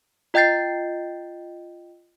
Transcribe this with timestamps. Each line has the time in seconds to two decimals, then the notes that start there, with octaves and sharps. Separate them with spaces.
0.34 F4 D#5 G5 G6 A6 C7